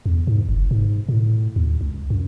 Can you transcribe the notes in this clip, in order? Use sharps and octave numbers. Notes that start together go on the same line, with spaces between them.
E2
G#2
F#1
G#2
A2
D#2
C#2
F#2